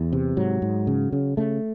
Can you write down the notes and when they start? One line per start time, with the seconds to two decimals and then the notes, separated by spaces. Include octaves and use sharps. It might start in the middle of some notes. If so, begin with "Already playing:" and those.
Already playing: E2 E3
0.13 C3
0.37 G#2 F#3
0.62 G#2
0.87 C#3
1.12 C#3
1.37 C#3 A3